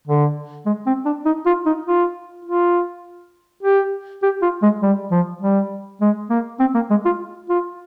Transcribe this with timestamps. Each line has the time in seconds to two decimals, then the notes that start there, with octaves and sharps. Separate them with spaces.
0.07 D3
0.66 G#3
0.86 C4
1.05 D4
1.25 D#4
1.46 F4
1.66 D#4
1.86 F4
2.45 F4
3.63 G4
4.23 G4
4.42 F4
4.62 G#3
4.83 G3
5.11 F3
5.42 G3
6.01 G#3
6.30 A#3
6.60 C4
6.75 A#3
6.90 G#3
7.05 F4
7.49 F4